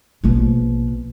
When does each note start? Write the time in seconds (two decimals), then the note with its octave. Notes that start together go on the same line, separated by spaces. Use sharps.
0.24 A#1 B2